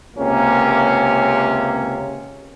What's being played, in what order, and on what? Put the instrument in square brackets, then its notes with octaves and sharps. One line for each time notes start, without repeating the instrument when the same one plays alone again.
[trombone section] C#2 C3 A#3 C#4